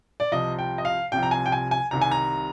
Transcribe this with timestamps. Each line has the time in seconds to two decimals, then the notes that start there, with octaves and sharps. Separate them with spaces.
0.20 D5
0.32 C2 C3 F3 D#5
0.59 G5
0.78 D#5
0.85 F5
1.12 C2 C3 F3 G5
1.23 A#5
1.31 G#5
1.46 G5
1.52 G#5
1.71 G#5
1.91 C2 C3 D#3 A#5
2.01 G#5
2.12 A#5